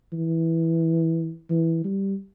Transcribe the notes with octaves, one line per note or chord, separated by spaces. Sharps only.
E3
E3
G3